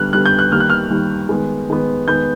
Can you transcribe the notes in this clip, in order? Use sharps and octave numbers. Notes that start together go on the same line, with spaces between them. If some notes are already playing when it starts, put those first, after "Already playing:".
Already playing: D3 G3 B3 F6 F#6
D3 G3 B3 F#6
G6
F#6
D#3 G3 A#3 F6
F#6
F6
D#3 G3 A#3
D#3 G#3 B3
D#3 G#3 B3
D#3 G#3 B3 G6